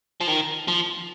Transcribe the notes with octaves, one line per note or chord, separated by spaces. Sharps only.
F3
D#3
F3